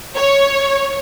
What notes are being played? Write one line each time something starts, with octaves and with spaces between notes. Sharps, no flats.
C#5